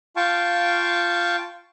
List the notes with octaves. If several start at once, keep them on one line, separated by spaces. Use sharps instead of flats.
F4 F5 G5 A5 C#6